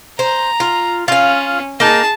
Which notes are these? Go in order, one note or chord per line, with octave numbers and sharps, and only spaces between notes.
C5 A#5
F4
C#4 F4 F5
A#3 D#4 G#4 A5